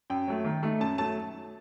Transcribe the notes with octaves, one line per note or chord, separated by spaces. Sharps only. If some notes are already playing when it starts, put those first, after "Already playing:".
F#2 G5
F#3 A3
D#3
A3 D#4
F#2 A5
F#3 A3 A5